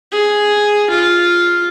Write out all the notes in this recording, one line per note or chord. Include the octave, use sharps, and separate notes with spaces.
G#4
F4